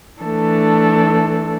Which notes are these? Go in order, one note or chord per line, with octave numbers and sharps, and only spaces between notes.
E3 A3 D4 A4